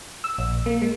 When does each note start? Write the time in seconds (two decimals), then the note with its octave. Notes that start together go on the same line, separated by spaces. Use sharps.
0.24 E6
0.38 A#1
0.66 A#3
0.82 G#3